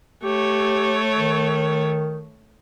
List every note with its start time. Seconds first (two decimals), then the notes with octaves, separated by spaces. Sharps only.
0.23 A3 G4 C#5
1.15 D#3